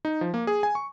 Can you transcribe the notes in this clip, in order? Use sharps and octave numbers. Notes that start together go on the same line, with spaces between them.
D#4
F3
A#3
G#4
G#5
C#6